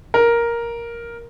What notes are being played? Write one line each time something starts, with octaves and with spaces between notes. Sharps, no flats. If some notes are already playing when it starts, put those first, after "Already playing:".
A#4